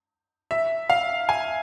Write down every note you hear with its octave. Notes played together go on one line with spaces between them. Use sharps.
E5
F5
G#5